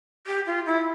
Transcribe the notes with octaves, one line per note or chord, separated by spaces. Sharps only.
G4
F4
E4